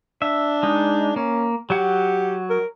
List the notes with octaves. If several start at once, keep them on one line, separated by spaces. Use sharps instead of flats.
D4 E5
G#3 D#4
A#3 C#4
F#3 G4 F#5
A#4